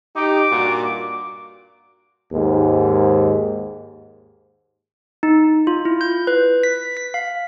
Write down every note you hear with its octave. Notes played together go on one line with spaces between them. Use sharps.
D#4 G4 D6
G2 A#2 F#4
D#2 G#2
D#4
F4
E4
G6
B4
B6
B6
F5